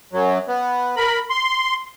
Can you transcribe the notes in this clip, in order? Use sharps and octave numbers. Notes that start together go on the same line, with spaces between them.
F#2 F#3
B3
A#4 B5
C6